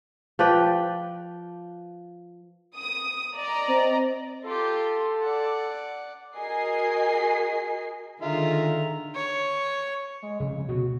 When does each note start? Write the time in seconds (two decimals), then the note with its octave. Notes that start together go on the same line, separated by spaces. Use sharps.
0.39 F3 B4 D5 G5
2.77 D#6
3.36 D5 D#5 A#5
3.68 C4
4.44 F4 G4 A4
5.22 D5 F#5
6.36 F#4 G#4 A#4 D#5 G#5 C7
8.22 D3 D#3 G#3 F4 E5 A#5
9.15 C#5
10.22 G#3
10.40 F1 C#3
10.69 D2 B2 B3 F#4